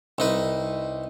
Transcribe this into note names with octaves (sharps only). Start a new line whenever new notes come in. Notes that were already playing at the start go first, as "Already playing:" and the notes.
C2 D#4 B4